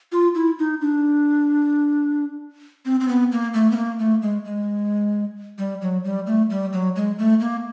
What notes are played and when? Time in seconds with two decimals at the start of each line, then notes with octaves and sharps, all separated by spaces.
0.12 F4
0.35 E4
0.59 D#4
0.81 D4
2.85 C4
3.00 C4
3.08 B3
3.32 A#3
3.54 A3
3.71 B3
3.76 A#3
3.99 A3
4.22 G#3
4.45 G#3
5.58 G3
5.81 F#3
6.04 G3
6.27 A3
6.50 G3
6.73 F#3
6.96 G#3
7.19 A3
7.40 A#3